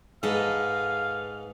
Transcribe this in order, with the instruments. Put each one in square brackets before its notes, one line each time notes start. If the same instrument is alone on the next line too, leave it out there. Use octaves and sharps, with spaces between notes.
[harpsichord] G#2 [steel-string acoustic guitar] A4 B4 D#5 [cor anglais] F5